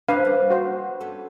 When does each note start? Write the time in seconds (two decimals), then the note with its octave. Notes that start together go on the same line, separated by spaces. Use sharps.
0.09 E3 F3 C4 D4 B4 F5
0.25 G3 A#3
0.50 F#4 C5
1.00 B3 C#4 A4